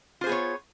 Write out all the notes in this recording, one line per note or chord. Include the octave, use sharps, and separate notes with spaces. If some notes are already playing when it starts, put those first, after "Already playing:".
B3 F4 G#4 C5 C#5